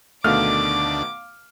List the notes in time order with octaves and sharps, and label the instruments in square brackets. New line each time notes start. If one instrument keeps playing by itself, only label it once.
[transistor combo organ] D2 D4 [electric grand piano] B2 D#3 A3 [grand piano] F5 F6 [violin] D6